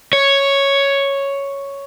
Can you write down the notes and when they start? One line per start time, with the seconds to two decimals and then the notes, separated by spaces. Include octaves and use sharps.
0.13 C#5